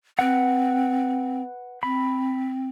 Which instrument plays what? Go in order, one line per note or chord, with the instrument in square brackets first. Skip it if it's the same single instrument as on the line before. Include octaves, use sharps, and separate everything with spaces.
[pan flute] C4 [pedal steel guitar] B4 F#5
[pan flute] C4 [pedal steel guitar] B5